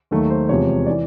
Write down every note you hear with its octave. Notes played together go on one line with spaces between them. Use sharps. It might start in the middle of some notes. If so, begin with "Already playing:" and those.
D#2 D#3 F#3 A3 F#4
C5
E2 C3 F3 G#3 C#5
E3 D5